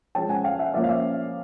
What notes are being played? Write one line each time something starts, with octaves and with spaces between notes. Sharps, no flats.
F3 G#3 C#4 G5 A5
F#5 G#5
F5 G5
E5 F#5
F3 A#3 C#4 D5 E5
F5
D5 E5